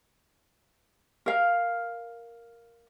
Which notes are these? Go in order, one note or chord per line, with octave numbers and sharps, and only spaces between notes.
A#4 F5